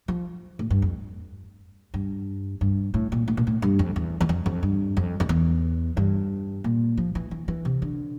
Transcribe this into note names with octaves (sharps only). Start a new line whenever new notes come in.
F3
A2
G2
F2
G2
G2
A2
A#2
A2
A#2
A2
G2
F2
E2
E2
F2
F2
G2
F2
F2
E2
G2
A#2
F3
E3
E3
E3
C3
D3